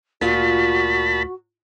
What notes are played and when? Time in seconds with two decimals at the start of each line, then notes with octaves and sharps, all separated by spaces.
0.21 D2 A#2 F4 F#4 A5 B5